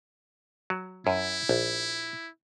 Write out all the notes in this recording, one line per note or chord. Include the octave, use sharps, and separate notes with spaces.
F#3
F#2 E4
A#1